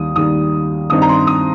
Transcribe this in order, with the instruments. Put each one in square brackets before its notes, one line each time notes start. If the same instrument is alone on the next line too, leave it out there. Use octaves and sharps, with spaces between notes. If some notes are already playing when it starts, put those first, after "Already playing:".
Already playing: [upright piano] D#2 D#3 G3 D#6
D#2 D#3 G3 D#6
G2 D#3 C4 D#4 D#6
A#5
C6
D#6